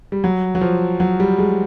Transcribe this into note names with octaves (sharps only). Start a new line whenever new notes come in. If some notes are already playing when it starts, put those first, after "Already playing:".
G3
F#3
F#3
F3
F#3
G3
G#3